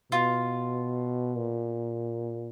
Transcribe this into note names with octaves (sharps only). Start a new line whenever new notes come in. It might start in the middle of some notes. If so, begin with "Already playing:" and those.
B2 F4
A#2